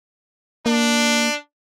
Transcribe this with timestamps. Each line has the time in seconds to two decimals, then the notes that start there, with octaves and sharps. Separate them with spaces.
0.66 A#3 D4